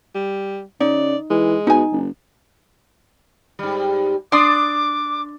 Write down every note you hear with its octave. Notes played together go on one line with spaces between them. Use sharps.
G3
C#3 D#4 D5
E3 G#3
B2 D#4 G#5
F#1
G#2 G3
D4 D5 C6 D6 D#6